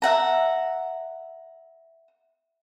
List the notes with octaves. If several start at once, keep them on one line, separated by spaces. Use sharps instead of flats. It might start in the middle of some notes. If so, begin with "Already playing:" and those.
E5 F#5 A#5